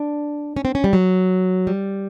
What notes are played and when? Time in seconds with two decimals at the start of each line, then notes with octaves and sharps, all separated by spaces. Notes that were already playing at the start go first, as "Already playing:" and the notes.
Already playing: D4
0.57 C#4
0.65 C4
0.75 C#4
0.84 G3
0.93 F#3
1.67 G3